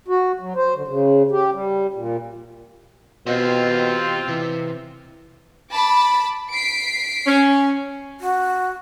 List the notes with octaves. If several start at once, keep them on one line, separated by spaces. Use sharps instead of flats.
F#4
F#3
C5
D3
C#3
G4
G3
A#2
B2 C4 F4 G4 D#5
C3 E3
A5 B5 D6
B6 C7 D7
C#4
F#4